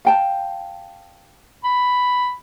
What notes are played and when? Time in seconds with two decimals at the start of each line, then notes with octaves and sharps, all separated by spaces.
0.05 F5 G5 A5
1.64 B5